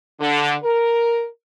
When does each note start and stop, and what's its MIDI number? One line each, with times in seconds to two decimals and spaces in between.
0.20 0.55 50
0.63 1.27 70